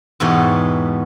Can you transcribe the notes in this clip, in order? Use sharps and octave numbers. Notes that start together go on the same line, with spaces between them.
E2 G#2 B2 B3 G4 C#5